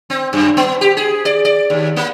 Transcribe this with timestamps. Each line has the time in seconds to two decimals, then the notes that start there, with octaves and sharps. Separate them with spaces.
0.10 C4
0.33 F#2
0.57 B3
0.81 G4
0.97 G#4
1.25 D5
1.45 D5
1.70 D#2
1.96 A#3